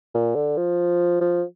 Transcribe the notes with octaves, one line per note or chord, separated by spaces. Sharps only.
A#2
D3
F3
F3